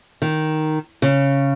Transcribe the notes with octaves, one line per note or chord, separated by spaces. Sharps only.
D#3
C#3